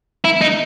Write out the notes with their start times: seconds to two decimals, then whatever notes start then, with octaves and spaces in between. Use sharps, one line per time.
0.24 E4
0.41 D#4